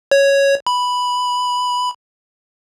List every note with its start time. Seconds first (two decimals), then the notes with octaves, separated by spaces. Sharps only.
0.11 C#5
0.67 B5